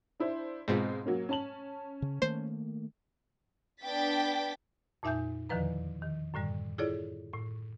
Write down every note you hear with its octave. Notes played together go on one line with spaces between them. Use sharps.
D4 E4 C5
G#2 B2 G#3 C4 F4
F#3 A#3 C#4
C#4 A5 F#7
C#3
D#3 A3 A#3 C5
B3 D4 G5 A6 B6
F2 A#2 D#4 E5 G#5 G6
E2 D3 D#3 F3 B4 A#5
D#3
F#2 A2 D3 G3
E4 F4 G#4 A4 C#5 D5
A2